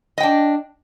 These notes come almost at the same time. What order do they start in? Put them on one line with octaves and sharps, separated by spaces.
D#5 G5 D4